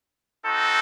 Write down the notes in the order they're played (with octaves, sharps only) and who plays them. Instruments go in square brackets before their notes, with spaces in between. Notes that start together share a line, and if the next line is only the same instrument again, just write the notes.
[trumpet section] C4 D#4 F#4 A4